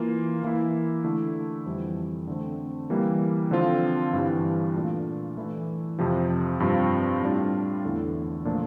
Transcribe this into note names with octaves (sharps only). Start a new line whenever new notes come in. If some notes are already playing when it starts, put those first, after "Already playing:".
Already playing: E3 A#3 F4
E3 A#3 E4
D3 A3 E4
F2 E3 G3
D3 A3 C4
E3 G3 A#3 E4
D3 F3 C4 F4
G2 E3 G3
A#2 A3 D4 F4
E3 A3 E4
F2 C3 F3
G2 F3 C4 F4
A2 G3 D4 F4
E2 D3 A3 E4
A#2 F3 A3 D4